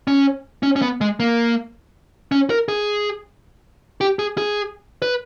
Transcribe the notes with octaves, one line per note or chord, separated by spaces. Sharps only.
C#4
C#4
C#4
B3
G#3
A#3
C#4
A#4
G#4
G4
G#4
G#4
B4